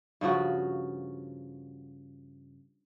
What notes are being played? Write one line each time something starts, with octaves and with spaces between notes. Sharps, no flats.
G2 C#3 F3 F#4